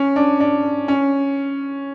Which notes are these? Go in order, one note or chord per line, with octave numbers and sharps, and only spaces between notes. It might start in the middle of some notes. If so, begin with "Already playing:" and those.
Already playing: C#4
D4
D4
C#4